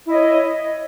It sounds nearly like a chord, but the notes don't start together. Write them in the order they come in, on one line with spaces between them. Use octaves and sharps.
E4 D#5 C#5